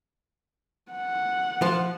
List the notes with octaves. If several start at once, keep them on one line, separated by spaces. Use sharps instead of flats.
F#5
F3